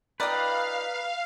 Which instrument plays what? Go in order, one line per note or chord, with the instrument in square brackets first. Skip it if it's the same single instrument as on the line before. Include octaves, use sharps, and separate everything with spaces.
[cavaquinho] D#4 F4 G5 [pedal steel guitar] B4 [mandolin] D5 D#6 F6 [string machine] F5